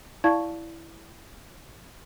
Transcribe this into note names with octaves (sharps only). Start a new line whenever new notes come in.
E4 D5 F5 A5 C#6 G#6